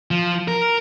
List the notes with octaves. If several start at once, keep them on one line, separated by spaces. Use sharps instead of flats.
F3
A#4